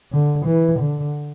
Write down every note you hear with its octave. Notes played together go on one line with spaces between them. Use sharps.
D3
E3
D3